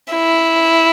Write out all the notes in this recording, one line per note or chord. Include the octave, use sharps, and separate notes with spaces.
E4